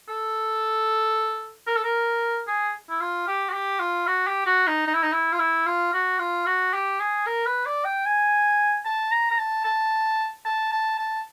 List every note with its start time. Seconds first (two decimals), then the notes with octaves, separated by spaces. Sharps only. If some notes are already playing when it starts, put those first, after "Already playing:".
0.08 A4
1.67 A#4
1.76 A4
1.84 A#4
2.47 G#4
2.89 E4
3.01 F4
3.27 G4
3.49 F#4
3.53 G4
3.80 F4
4.07 F#4
4.27 G4
4.46 F#4
4.67 D#4
4.87 D#4
4.94 E4
5.03 D#4
5.13 E4
5.33 F4
5.39 E4
5.66 F4
5.93 F#4
6.19 F4
6.46 F#4
6.73 G4
7.00 G#4
7.26 A#4
7.46 B4
7.66 D5
7.85 G5
8.06 G#5
8.85 A5
9.12 A#5
9.31 A#5
9.38 A5
9.64 A5
10.45 A5
10.72 A5
10.99 A5